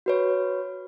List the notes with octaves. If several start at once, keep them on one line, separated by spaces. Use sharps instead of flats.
F#4 B4 C#5